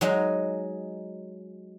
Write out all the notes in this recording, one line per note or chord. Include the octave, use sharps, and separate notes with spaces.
F#3 G#3 D#4